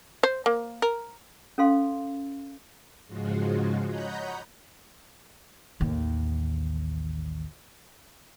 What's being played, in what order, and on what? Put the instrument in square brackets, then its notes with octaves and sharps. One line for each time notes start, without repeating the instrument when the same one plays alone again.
[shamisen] C5
A#3
A#4
[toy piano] C#4 A4 F5 C6
[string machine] G#2 C#3 F3 G#3 F4 F#4
C#5 D#5 F#5 A#5 B5 G6
[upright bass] A1 D#2